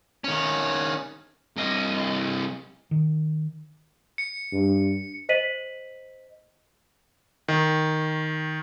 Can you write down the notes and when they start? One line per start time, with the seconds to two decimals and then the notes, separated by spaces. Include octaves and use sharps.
0.24 D#3 C#4
1.56 C2 D#5
2.91 D#3
4.18 C#7
4.52 G2
5.29 C5 D#5 B6 D#7 F#7
7.48 D#3